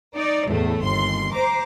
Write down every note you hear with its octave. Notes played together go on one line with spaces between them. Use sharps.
D#4 D5
E2 A2 A3
G1 D#2 C6
C5 A#5 D6